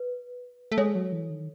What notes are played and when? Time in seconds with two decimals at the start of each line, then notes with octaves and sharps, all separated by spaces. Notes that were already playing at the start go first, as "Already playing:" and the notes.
Already playing: B4
0.72 A3
0.78 G#3 A4 C#5
0.95 F#3
1.12 E3
1.30 D#3